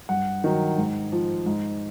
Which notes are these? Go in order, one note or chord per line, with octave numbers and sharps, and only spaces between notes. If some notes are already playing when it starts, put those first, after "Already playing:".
G2 F#5
D#3 F#3
G#2
F3
G#2